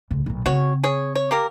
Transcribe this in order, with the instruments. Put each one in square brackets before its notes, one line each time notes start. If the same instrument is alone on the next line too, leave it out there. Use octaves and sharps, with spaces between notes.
[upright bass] C#2 A2
B1 A#2
[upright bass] C#3 C4 [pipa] F#4 C#5
[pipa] G#4 C#5
C#5
A#3 G4 A#4